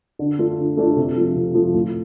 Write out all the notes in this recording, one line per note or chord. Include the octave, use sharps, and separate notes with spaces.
D3
A3 D4 F4
D3
A3 D4 F4
C3
F3 A3
C3
F3 A3
A2